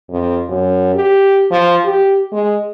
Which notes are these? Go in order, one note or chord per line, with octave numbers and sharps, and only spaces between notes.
F2
F#2
G4
F3
G4
G#3